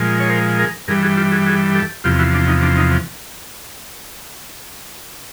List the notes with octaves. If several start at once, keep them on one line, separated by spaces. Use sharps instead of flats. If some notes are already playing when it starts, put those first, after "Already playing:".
Already playing: A#2 F3 G#3
C#5
A#4 C5
G#4 A#4
G2 E3 G3 G#4 A#4
F#4 G#4
F4 G4
F#4 G#4
F#4 G#4
G4 A4
E2 C3 F3 F4 G4
E4 F#4
D4
D#4
D4
D#4